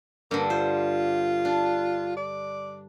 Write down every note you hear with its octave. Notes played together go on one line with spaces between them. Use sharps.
G2 D3 A#3
F4 C5
D4
D5